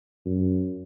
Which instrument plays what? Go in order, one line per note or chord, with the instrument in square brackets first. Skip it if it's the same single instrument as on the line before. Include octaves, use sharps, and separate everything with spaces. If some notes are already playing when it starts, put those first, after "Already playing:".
[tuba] F#2